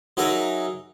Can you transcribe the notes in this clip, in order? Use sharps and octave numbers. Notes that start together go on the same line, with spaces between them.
F#3 D#4 G#4 A#4 E5